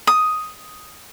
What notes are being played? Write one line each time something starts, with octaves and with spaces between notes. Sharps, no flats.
D#6